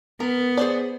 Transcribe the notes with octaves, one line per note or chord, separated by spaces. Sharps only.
B3 A#4
G#4 C5 D5